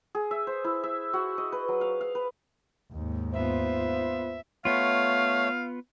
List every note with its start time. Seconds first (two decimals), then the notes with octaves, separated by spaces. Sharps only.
0.15 G#4
0.31 E5
0.47 C5
0.64 E4
0.84 E5
1.13 F#4
1.38 D#5
1.52 B4
1.68 F#3
1.81 F5
2.01 F5
2.15 B4
2.92 D#2 G#2
3.34 B3 F4 C5 E5
4.65 A3 B3 F4 C#5 F5